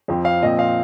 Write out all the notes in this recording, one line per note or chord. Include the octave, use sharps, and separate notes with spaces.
F2 F3 C4
F5
A#2 F3 C4 D#5
F5